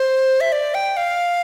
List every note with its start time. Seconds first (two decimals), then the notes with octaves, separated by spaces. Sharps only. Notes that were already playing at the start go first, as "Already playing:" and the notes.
Already playing: C5
0.41 E5
0.52 D5
0.74 G5
0.97 F5